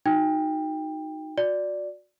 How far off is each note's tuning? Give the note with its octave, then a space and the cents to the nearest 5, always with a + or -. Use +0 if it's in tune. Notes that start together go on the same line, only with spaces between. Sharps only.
D#4 +0 F#4 -20 G5 +20
F#4 -25 D5 +0